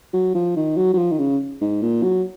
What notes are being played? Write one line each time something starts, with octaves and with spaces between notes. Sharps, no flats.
F#3
F3
D#3
F#3
F#3
F3
D#3
C#3
G#2
A#2
F#3